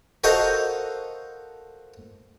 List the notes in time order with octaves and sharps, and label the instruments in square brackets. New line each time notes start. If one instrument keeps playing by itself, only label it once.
[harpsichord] F#4 A4 A#4 C5 D#5 F5